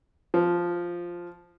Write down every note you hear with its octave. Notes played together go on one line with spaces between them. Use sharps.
F3